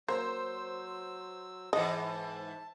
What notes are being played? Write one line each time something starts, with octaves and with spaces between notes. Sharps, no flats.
F#3 A#3 C5 E6
G#2 E3 D#5 A5